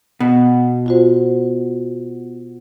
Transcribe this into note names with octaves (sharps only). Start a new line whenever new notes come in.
B2
F4 F#4 C5